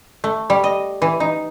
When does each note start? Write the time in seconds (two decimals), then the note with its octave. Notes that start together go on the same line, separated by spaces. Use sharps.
0.24 A3
0.50 G3
0.64 D#5
1.02 E3
1.20 D#4